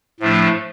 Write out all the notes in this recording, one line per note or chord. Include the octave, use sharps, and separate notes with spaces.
A2 F3 A3 D4